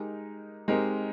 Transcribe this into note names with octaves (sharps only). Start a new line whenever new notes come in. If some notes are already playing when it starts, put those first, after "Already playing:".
Already playing: G#3 D#4 G4 A#4
G#3 C4 D#4 G4 A#4